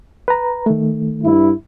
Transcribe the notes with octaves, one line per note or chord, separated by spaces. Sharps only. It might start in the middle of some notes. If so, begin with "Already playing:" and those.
B4 A#5
D#3 A3
G2 E4